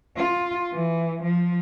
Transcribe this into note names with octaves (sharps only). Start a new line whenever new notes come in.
F4
E3
F3